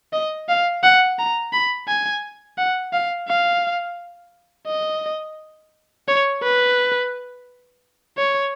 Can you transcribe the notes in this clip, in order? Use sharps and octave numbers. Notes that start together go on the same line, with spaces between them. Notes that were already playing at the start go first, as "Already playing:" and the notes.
D#5
F5
F#5
A#5
B5
G#5
F#5
F5
F5
D#5
C#5
B4
C#5